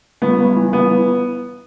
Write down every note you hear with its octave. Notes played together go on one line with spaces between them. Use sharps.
G1 B3
G2
E3
G1 B3
E3